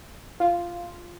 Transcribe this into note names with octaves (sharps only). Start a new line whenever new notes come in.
F4